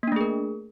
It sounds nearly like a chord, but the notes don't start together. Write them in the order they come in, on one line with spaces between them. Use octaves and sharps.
A#3 D4 A3 G#4 A#4